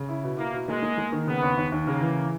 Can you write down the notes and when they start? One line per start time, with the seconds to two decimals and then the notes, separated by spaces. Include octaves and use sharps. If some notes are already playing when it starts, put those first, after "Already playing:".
Already playing: C#3
0.09 E4
0.23 B2
0.37 A#3 E4
0.53 B2
0.68 G#3 A#3
0.82 A#3
0.98 A#3
1.12 D#3
1.27 C#3 B3
1.42 D#2
1.57 D#2
1.72 D#2
1.87 C#3 A#3
2.01 E3